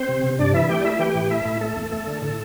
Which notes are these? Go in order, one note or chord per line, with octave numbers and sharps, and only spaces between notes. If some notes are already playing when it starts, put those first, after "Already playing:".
Already playing: C4 C5
C3
C3
G2 D4 D5
E3 E4 E5
A3 G4 G5
D5
A3 E4 E5
E3 G4 G5
A2
A3 E4 E5
A2
A3 A4
E2
A3 A4
D3
A2 A4